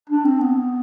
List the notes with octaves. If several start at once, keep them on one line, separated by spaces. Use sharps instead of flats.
D4
C4
B3